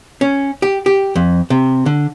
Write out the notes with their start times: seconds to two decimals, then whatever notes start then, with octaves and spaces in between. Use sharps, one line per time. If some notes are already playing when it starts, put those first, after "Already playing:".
0.21 C#4
0.62 G4
0.86 G4
1.16 F2
1.50 C3
1.86 D3